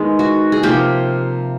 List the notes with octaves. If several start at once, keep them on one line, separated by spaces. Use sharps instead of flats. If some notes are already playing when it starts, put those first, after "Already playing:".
Already playing: D#3 G#3 B3
F#4
G#4
C3 F3 A#3 G4